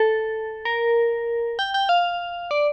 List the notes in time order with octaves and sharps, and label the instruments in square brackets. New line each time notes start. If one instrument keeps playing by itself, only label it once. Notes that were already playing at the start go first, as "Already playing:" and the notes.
Already playing: [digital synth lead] A4
A#4
G5
G5
F5
D5